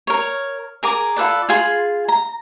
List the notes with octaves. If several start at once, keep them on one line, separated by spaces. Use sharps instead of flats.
A#4 C#5
G#4 A#4 A#5 D6
F4 A4 B4 D5
F4 G#4 C6
A#5